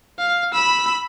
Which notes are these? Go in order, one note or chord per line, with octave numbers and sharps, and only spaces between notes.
F5
B5 E6